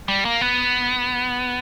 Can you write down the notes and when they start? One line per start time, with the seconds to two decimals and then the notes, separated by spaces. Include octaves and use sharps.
0.08 G3
0.25 A#3
0.41 B3